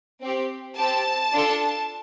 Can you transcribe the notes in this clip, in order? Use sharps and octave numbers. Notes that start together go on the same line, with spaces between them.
C4 G4
C4 G4 A5
D4 F4 A4